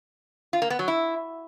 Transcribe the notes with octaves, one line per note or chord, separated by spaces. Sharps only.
F4
A#3
B3
F#3
E4